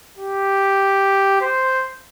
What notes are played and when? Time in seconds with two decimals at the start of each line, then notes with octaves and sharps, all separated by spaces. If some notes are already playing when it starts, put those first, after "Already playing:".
0.18 G4
1.41 C5